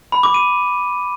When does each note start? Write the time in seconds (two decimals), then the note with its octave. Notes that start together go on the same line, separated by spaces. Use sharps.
0.12 B5
0.23 D6
0.34 D#7